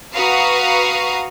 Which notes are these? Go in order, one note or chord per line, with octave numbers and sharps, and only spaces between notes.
F#4 B4 F5 A#5 C#6 D#6